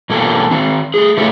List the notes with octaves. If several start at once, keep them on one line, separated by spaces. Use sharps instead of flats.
B2 E3 A#3 A4
D#3 C4
A3 G#4
C#3 A3 E4 G4 A4